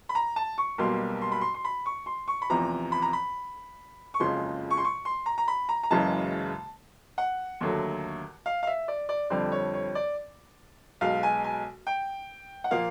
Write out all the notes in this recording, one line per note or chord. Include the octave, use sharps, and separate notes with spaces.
B5
A#5
A5
C#6
B1 B2 G3 A#3 C6
C6
B5
C6
C6
B5
C#6
C6
C#6
B5
F1 E2 C3 F3 A#5
B5
A#5
B5
C#6
F#1 F2 C#3 F3 G#3 C6
C#6
C6
C#6
C6
A#5
A#5
B5
A#5
A#5
F#1 F#2 C#3 E3 G#3 A5
F#5
D#2 D3 F#3 A3
F5
F5
E5
D5
D5
F2 D3 G3 C4 D5
C#5
C#5
D5
B1 B2 G#3 F5
G#5
G#5
G5
F#5
A#2 F3 A#3 F5